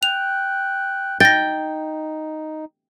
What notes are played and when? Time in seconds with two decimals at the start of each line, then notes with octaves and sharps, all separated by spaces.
0.03 G5 F#6 F7
1.20 D#4 G5 A6 A#6